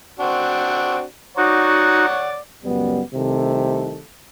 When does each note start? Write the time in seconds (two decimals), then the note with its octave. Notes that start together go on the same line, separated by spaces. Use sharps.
0.19 C4 D4 F#4
1.37 D#4 F#4 C#5 D5 F#5
2.64 C#2 F#2 G3 B3
3.14 C2 C3 D#3 A3 A4